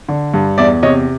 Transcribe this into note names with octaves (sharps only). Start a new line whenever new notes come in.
D3
G2
E2 D5 E5
C3 C#5 D#5